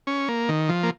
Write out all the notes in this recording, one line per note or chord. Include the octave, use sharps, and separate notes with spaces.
C#4
A#3
D#3
F3
A#3